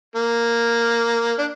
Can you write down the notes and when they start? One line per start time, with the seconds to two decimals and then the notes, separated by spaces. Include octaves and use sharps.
0.16 A#3
1.38 D4